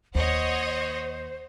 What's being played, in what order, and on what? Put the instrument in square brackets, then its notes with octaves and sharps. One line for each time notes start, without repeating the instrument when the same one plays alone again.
[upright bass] D#2 [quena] C5 [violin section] C#5 D#5 F#5